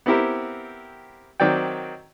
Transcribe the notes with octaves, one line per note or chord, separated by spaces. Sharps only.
B3 C4 E4 G4 A#4
D#3 F#3 C4 D5 G5